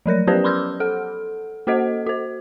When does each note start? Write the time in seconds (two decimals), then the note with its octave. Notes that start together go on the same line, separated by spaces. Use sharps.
0.06 F3 F#3 A#4 A#6
0.27 B3 C#4 G4 B4 C5 D5
0.44 B5 C6 D6 E6 F6 G6
0.80 A4 F#5
1.67 A#3 F#4 A4 C5 D#5 F#5
2.06 F#4 C5